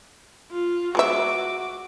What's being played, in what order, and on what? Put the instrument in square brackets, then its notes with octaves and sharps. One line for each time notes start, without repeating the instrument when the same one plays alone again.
[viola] F4
[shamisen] G#3 B3 E5 [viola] F#4 D6